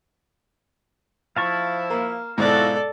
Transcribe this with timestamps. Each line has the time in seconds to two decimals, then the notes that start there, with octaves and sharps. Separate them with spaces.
1.36 F3 E4 F5 A5 C#6
1.90 A#3
2.38 G#2 B2 F3 E4 F#4 A4 D5